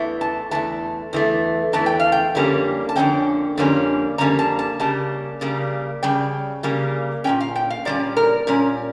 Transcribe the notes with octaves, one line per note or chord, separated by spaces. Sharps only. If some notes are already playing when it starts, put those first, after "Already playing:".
Already playing: E2 E3 A3
A5
E2 E3 A3 A5
E2 E3 A3
E2 E3 A3 A5
G5
F5
G5
F2 D3 G3 A#3 C#4
A5
F2 D3 G3 A#3 C#4 G5
F2 D3 G3 A#3 C#4
F2 D3 G3 A#3 C#4 A#5
A5
A5
C#3 G3 A#3 A5
C#3 G3 A#3
C#3 G3 G5
C#3 G3 A#3
A#2 G3 C#4 G5
F5
G5
F5
A#2 G3 C#4 D5
A#4
A#2 G3 C#4